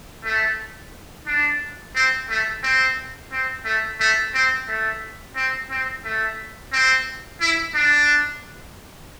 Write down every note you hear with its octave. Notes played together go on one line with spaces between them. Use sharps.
A3
D4
C4
A3
C4
C4
A3
A3
C4
A3
C4
C4
A3
C4
E4
D4